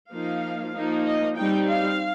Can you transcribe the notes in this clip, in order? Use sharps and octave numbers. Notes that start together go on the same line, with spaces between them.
F3 A#3 D#4 F5
F3 A#3 D#4
D#5
G3 C4 D#4 G5
F5